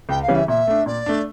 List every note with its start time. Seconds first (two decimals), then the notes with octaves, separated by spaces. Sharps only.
0.09 C#2 G5
0.22 F5
0.28 C#3 E3 G3 C#4
0.35 E5
0.48 A#2 E5
0.67 A3 D4
0.86 A#2 D5
1.06 A3 D4